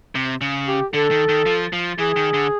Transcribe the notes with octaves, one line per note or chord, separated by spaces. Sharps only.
C3
C#3
G4
D3 A4
D#3
D#3
F3
F3
E3 G#4
D#3
D3